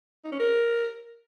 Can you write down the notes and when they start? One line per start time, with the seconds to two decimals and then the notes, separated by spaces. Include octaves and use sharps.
0.24 D#4
0.32 C#4
0.39 A#4